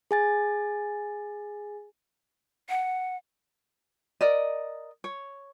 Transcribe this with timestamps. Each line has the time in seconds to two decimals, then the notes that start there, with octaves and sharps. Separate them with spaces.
0.11 G#4 G#5 A6
2.69 F#5
4.21 A#4 D5 D#5
5.04 C#5